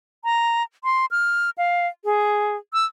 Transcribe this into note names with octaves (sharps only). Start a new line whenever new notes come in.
A#5
C6
F6
F5
G#4
E6